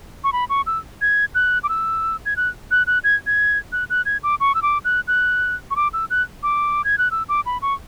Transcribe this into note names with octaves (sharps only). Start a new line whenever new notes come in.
C#6
B5
C#6
E6
G#6
F#6
D6
E6
G#6
F#6
F#6
F#6
G#6
G#6
F#6
F#6
G#6
D6
C#6
E6
D6
F#6
F#6
C#6
D6
E6
F#6
D6
G#6
F#6
E6
D6
B5
C#6